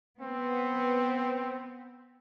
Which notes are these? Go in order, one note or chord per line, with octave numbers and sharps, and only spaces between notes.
B3 C4